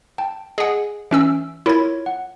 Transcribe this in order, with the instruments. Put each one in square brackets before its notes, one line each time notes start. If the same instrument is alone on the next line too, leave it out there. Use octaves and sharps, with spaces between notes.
[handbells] G5 A5
[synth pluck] G#4 F#5 [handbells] D#5 G#5
[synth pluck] E3 C#4 E6 [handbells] E5 D7
[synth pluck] E4 G#6 [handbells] F4 A#4 C#5
[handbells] F#5